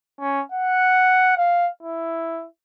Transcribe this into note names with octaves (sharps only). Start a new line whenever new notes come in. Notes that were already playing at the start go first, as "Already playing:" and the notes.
C#4
F#5
F5
E4